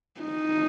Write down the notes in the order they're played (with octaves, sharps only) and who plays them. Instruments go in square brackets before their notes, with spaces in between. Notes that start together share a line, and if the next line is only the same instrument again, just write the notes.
[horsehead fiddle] D#4